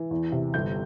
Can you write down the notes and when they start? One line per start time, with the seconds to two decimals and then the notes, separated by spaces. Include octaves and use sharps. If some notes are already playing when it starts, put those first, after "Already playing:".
Already playing: E3
0.11 E2
0.32 C3
0.54 G1 G6